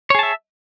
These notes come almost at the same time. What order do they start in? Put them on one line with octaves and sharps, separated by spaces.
C#5 G#4 A5 E5